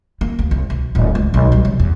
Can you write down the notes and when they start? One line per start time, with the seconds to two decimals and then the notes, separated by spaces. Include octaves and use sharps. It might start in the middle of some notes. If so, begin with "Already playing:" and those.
0.21 A#3
0.39 D2
0.51 C2
0.70 B1
0.95 D1
1.15 C#2
1.34 B1
1.52 G3
1.65 C2
1.80 E2